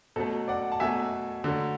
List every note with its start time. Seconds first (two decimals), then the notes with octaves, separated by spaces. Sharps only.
0.16 B2 F#3 A3 A4
0.48 D5 F#5
0.72 A5
0.80 B2 F#3 A3 E5 G#5
1.44 D3 F#3 A3